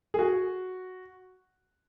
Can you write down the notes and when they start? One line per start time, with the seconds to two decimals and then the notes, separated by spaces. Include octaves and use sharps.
0.14 G#4
0.19 F#4